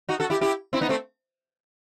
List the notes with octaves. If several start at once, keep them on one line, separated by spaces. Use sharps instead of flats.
D#4 F#4
F#4 A4
E4 G4
E4 G4
C4 E4
B3 D#4
A3 C4